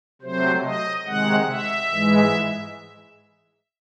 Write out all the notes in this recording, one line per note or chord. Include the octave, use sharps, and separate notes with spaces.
C3 F#3 A3 C5
D#5
C3 D#3 G#3 F#5
E5
G#2 E3 G#3